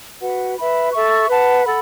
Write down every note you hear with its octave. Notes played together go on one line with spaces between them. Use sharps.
F#4 B4 F#5
B4 E5 B5
A4 E5 C#6
B4 F#5 A5
A4 F#5 B5